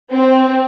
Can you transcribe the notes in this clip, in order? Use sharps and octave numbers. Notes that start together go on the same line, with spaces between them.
C4